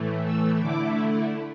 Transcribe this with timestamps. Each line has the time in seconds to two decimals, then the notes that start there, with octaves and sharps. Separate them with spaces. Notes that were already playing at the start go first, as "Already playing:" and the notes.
Already playing: A2 E3 A3
0.25 E6
0.59 D3 A3 E4 D6